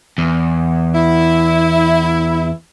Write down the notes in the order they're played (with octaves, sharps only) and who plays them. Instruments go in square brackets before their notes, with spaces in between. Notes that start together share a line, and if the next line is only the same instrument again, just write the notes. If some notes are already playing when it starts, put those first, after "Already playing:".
[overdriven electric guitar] E2
[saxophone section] E4